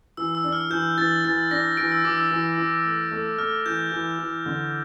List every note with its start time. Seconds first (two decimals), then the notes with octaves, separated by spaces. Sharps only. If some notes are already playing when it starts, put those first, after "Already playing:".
0.17 E3 E6
0.35 E6
0.44 D4
0.52 F6
0.70 E3 G6
0.98 E3 A6
1.24 E3 A6
1.51 D4 A#6
1.77 E3 A#6 D7
1.92 E6
2.05 E3 D6
2.17 E6
2.31 E3
2.58 E3
2.85 A3
3.11 A3
3.38 A3 F6
3.66 E3 G6
3.92 E3
4.19 E3
4.46 D3